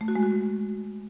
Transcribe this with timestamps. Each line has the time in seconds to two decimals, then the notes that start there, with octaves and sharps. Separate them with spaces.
0.01 A3
0.08 F#4
0.16 G#3
0.23 F#4